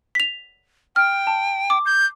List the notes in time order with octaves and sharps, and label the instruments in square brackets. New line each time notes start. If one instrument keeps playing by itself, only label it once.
[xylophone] B6 F7
[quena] G5 [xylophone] F6
[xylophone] A5
D6
[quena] G6